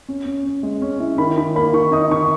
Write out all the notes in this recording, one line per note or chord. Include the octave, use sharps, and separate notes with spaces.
C#4
C#4
C#4
G#3
C#4
E4
D#3 B5
D#3 B5
A#3 B5
D#3 C#6
D#4 D#6
D#3 C#6